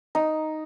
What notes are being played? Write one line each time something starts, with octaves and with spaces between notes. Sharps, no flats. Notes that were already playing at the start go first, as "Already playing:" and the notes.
D#4